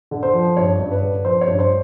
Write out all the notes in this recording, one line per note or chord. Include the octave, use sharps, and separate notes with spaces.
D3
C5
F3
G2 C#5
G2
B4
D3
F3 C5
C#5
G2
C5